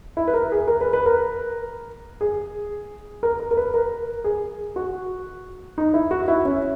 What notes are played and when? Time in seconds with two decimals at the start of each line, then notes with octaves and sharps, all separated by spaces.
0.17 E4
0.27 B4
0.34 A#4
0.52 G#4
0.68 A#4
0.81 B4
0.93 B4
1.06 A#4
2.21 G#4
3.23 A#4
3.40 A#4
3.51 A#4
3.57 B4
3.74 A#4
4.24 G#4
4.76 F#4
5.78 D#4
5.94 E4
6.11 F#4
6.28 E4
6.45 C#4